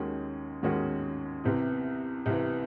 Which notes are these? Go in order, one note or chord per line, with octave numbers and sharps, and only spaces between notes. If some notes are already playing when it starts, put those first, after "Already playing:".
Already playing: D#2 D#3 G#3 C#4 F#4
D#2 D#3 G#3 C#4 F#4
C2 C3 E3
C2 C3 E3